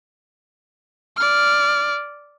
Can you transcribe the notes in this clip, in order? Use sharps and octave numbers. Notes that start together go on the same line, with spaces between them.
D5 F6